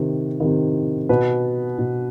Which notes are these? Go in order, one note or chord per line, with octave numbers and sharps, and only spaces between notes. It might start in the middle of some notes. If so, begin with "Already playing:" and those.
Already playing: C3 D#3
C3 D#3
B2 B4
B2